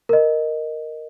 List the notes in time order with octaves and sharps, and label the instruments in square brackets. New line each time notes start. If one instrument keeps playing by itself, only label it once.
[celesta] A#4 D#5